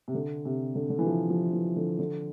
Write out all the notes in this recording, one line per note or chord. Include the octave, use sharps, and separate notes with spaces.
C3
D3
C3
D3
D3
E3
F3
F3
E3
D3
D3